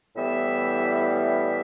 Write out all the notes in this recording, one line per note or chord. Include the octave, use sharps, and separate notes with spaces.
A2 E3 G3 B3 E5
E5